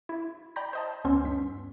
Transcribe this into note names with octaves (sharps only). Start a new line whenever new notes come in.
E4
D5 G5 A#5 B5 G6 A#6
C5 D#5 A5
D2 B3 C#4 C6 E6 G6
G2 B6